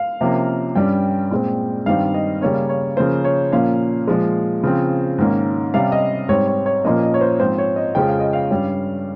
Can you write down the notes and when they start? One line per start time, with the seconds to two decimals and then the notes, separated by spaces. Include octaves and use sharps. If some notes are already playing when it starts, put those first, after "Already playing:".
Already playing: F5
0.21 C3 F3 A#3 C#4
0.75 G2 G3 C#4 G5
1.31 A#2 G#3 C4
1.86 G2 D#3 G3 C4 F5
2.14 D#5
2.41 C#3 G3 A#3 C#4 C#5
2.69 C#5
2.96 C#3 F3 A#3 C#4 C5
3.24 C#5
3.52 A#2 F3 A#3 C#4 F5
4.07 A#2 F3 G#3
4.63 C#3 F3 C4
5.18 G#2 D#3 A#3 C#4
5.74 C3 G3 C#4 F5
5.92 D#5
6.29 G#2 G3 C4 C#5
6.48 C#5
6.66 C#5
6.84 A#2 F3 A#3 C#4 D#5
7.03 D#5
7.14 C#5
7.21 C5
7.40 G#2 F3 C4 C5
7.58 C#5
7.76 D#5
7.95 F2 C#3 F3 G#3 C#4 G5
8.08 F5
8.20 D#5
8.33 F5
8.50 G2 G3 C#4